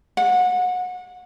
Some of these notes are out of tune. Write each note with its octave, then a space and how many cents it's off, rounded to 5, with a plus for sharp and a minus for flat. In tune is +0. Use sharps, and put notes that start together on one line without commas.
F#5 -30